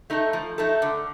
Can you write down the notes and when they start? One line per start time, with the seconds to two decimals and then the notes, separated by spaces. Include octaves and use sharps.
0.10 A3 D#4 A4
0.33 F3
0.58 A3 D#4 A4
0.82 D3